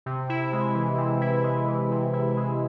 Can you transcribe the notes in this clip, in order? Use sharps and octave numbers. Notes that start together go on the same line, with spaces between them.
C3
E4
G#3
E3
C3
E4
G#3
E3
C3
E4
G#3